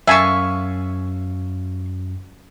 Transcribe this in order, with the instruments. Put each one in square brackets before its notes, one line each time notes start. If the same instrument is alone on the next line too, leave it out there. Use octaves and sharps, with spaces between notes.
[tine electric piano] F#2 [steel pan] E5 G#5 A5 [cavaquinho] F5 C#6